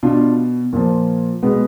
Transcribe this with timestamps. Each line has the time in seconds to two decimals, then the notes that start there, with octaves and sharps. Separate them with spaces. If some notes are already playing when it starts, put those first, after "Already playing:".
0.03 B2 D4 F4
0.73 A#2 F3
1.42 B2 G#3 B3